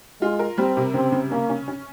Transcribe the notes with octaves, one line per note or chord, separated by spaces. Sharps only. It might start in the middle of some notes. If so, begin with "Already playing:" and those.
G#3 F4
A#4
G3 C4
C3
C#3 C4
C#3
A#3 C#4
C#4
C#4